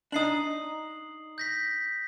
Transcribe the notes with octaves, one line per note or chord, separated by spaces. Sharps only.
D4 D#4 D#6 C7 F#7
G6 A#6 B6